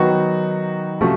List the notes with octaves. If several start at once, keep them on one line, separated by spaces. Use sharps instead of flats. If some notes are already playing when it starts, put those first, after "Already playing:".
Already playing: D#3 F#3 B3 D#4 F#4
C3 F3 A3 C#4 F#4